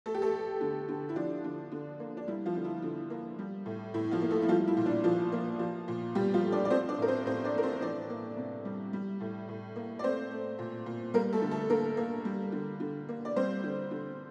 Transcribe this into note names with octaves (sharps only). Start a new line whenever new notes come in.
A3 A4
G4
A3 A4
A3
D3
D3
E4
F3 D4
D3
D3
A#3
D4
G3 E4
F3 F4
D3
E4
D3
A#3
G3
A2
A2 E4
F3 F4
A#3
A3 A4
E4
F3 G3 F4
E4
A#2
D4
A#2 F3 F4
A#3
F3
A#2
A#2 G3 G4
F3 F4
A3
D4 D5
D5
F3 C4 C5
D4 D5
A2 A#4
C4 C5
A2 C4 C5
D4 D5
A3 A#4
C4 C5
E3 D4 D5
A#3
C3
G3
G3
A2
A2
A#3
D5
A3 C4 C5
A3
A#2
A#2
G3 A#3 A#4
A3 A4
D3
A3 A4
D3 A#3 A#4
A#3
G3
D3
D3
A#3
D5
G3 C4 C5
D3
D3